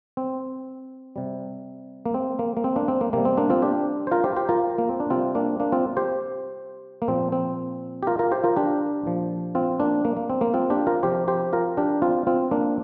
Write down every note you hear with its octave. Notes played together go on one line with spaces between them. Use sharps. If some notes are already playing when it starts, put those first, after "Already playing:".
C4
C3 G3
A#3
C4
A#3
A#3
C4
A#3 D4
C4
A#3
C3 G3 A#3
C4
A#3 D4
C4 F4
D4 G4
C5
F4 A#4
G4 C5
G4 C5
F4 A#4
A#3
C4
D4
C3 G3 C4 F4
A#3 D4
A#3 D4
C4 F4
G4 C5
A#3
A#2 F3 C4
C4
G4
F4 A#4
F4 A#4
G4 C5
F4 A#4
D4 G4
A#2 F3
C4 F4
A#3 D4
A#3
A#3
C4
A#3
C4 F4
D4 G4
F4 A#4
C3 F3 G4 C5
G4 C5
F4 A#4
D4 G4
C4 F4
C4 F4
A#3 D4